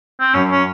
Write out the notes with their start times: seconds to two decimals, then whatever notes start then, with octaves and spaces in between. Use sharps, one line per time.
0.20 C4
0.33 F#2 C#4
0.51 C#4